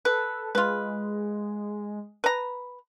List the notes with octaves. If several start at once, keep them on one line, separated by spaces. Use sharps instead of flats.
A4 B4
G#3 F4 B4
B4 A#5